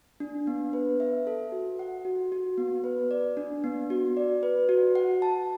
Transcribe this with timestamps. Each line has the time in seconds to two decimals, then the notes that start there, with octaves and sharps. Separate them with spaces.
0.20 D4
0.47 B3
0.73 B4
1.00 E5
1.27 A4
1.52 F#4
1.79 F#5
2.05 F#4
2.32 F#4
2.58 B3
2.84 B4
3.11 D5
3.37 D4
3.64 B3
3.90 F#4
4.17 D5
4.43 B4
4.69 F#4
4.95 F#5
5.22 A5